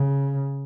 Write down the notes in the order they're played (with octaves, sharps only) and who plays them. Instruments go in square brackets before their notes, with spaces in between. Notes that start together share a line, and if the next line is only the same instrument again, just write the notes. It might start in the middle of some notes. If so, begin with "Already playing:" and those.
Already playing: [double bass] C#3